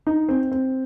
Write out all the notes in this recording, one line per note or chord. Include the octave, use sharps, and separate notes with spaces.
D#4
C4
C4